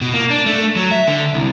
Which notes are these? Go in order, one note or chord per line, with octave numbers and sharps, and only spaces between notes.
B2
A#3
D4
A3
F#3
E5
D3
C2